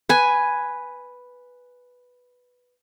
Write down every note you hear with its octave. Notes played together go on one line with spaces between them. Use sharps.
B4 G#5